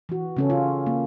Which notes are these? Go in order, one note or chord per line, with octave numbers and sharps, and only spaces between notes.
E3 F#4
C#3 C#4 A4
F4
A#3